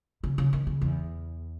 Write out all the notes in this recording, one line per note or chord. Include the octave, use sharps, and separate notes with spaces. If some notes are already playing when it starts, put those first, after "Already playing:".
C#3
C#3
D#3
C#3
E2